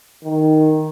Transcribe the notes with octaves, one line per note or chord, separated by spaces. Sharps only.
D#3